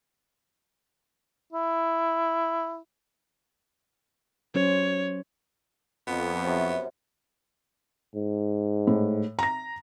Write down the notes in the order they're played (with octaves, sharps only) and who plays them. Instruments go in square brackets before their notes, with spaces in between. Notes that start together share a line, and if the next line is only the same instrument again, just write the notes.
[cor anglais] E4
[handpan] F#3 C#4 C5 [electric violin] C#5
[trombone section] F2 [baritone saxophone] B3
[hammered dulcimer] F#2 C3 C#6
[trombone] G#2
[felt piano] A2
A#5 A#6